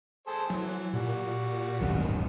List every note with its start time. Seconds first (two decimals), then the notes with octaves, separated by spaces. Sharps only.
0.27 G#4 A4 C5
0.50 E3 F#3
0.93 A#2 G3 F#4
1.81 D1 G#1 F#2 D#3